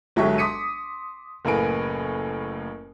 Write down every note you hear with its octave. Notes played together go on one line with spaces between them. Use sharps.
G1 F#3 G#3 G4 E5 C#6
C6 D6 D#6 B6 C#7 D#7
F#1 A2 A#3 B4 G#5 D7